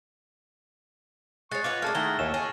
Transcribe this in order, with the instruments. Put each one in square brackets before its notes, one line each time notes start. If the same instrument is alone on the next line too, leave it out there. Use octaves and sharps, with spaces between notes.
[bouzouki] G#3 C#5 [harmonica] C#6 [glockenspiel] F#6 A6
[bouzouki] F4 B4 C#5 [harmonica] D#5 F#5 [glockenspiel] D6
[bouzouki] G#3 D4 [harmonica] A3 [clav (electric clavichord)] A#4 [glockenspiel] A5 F6
[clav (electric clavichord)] D#3 A3 [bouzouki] E4 F#5 [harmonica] G#4 A#5 [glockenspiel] G7
[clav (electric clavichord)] D#2 G#5 [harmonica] A3 C#5 E5 [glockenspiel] E7
[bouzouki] G#4 [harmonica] A4 C#5 [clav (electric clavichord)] D#5